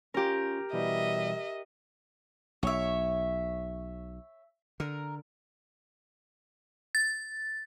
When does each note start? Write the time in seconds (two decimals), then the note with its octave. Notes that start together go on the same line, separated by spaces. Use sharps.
0.14 C#4 F4 G4 A#4
0.73 B2 E3 G3 D#5 E5
2.63 B1 C#5 E5
4.80 D3 A#4
6.95 A6